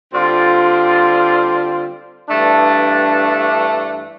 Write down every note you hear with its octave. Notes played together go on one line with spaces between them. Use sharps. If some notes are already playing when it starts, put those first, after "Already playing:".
D3 G3 C4 F4
G2 E3 A3 D4